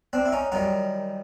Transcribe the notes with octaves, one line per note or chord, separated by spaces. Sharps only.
C4 D4
E4
C#4 D#4
F#2 D#3 G3 D#4 F4